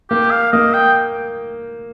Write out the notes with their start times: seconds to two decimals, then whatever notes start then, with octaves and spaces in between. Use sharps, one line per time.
0.10 A#3 G4
0.31 F5
0.52 A#3 D#5
0.74 G5